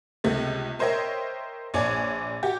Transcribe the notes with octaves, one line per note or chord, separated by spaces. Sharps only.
C#2 C3 A3
A#4 C5 C#5 D#5 E5 G5
A#1 C#5 D5 G#5
F#4 G4